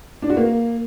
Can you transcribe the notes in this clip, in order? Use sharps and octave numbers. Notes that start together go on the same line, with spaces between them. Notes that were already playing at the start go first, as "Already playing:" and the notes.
D4
F#4
A#3